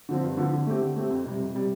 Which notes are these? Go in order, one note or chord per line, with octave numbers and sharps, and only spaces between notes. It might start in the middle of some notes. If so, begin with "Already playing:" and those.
D3 F3 C4
G2
D3 F3 C4
D3
A3 C4 G4
D3
A3 C4 G4
F2
C3 G3
F2
C3 G3